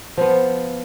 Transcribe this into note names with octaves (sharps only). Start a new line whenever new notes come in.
F3 B3